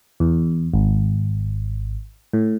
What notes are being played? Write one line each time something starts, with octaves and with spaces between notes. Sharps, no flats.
E2
G#1
A2